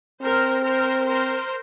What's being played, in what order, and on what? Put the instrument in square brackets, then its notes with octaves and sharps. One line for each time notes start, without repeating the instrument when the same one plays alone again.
[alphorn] C4 [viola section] A#4 C5
[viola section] A#4 C5
A#4 C5